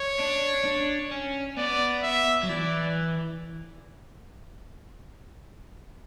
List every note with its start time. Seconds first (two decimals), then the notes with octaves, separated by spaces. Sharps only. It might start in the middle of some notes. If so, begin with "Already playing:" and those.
Already playing: C#5
0.20 D4
0.65 D4
1.11 C#4
1.57 B3 D5
2.03 E5
2.43 F#3
2.49 E3 D5